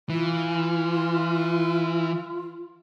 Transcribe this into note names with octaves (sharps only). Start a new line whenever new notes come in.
E3 F4